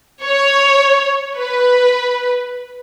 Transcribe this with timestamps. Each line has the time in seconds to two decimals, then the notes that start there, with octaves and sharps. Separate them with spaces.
0.24 C#5
1.38 B4